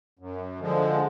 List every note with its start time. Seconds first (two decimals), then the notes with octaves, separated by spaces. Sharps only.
0.19 F#2
0.59 D3 F3 G#3